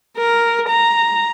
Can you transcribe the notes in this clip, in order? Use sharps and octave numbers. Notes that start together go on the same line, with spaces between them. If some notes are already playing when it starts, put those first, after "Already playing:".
A#4
A#5